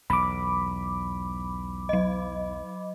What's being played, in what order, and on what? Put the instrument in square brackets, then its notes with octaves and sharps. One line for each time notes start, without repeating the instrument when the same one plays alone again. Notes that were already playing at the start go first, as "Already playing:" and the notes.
[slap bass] B1 E2 [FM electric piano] B5 D6
[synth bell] F#3 D#5